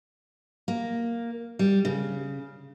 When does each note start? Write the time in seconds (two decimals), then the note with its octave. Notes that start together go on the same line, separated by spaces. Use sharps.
0.68 A#3
1.59 G3
1.85 C#3